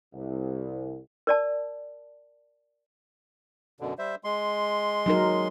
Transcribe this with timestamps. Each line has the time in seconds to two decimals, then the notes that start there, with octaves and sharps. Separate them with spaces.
0.13 C2
1.27 A#4 D5 A5
3.80 F#2 B2 D3
3.98 G3 C5 E5
4.24 G#3 C6
5.06 F#3 D#4 A#4